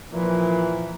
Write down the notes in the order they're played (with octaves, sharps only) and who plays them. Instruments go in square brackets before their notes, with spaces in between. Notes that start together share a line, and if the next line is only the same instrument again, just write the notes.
[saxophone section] A#2 E3 [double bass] F3